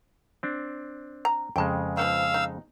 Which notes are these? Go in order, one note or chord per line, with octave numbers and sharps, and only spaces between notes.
C4 D4
A#5
F2 C#3 G#3 G5 A5
F3 B3 D#4 F5 E6
D#4